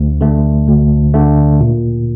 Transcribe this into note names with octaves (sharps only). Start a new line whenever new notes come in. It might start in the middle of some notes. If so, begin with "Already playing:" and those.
Already playing: D2
D3 A3
D2
D3 A3
A#2